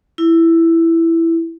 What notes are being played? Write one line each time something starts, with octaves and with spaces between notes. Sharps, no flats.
E4